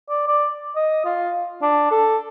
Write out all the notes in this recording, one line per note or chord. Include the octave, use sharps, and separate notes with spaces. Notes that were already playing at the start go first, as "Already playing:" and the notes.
D5
D5
D#5
F4
D4
A4